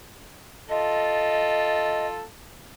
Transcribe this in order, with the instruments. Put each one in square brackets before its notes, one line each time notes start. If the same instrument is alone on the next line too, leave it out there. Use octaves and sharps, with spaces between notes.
[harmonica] F4 A4 [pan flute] D#5